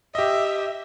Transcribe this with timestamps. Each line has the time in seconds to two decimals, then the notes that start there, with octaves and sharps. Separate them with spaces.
0.15 G4 D#5 E5